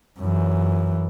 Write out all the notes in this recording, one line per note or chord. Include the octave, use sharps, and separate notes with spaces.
F#2 E3